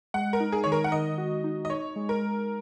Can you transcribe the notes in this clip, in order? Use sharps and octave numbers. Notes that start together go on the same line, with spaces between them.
G#3 F#5
A#4
D#4
G#4
D#3 C#5
A#4
F#5
D#3 D#5
F#4
D#4
D#5
D#4 C#5
G#3
A#4
G#3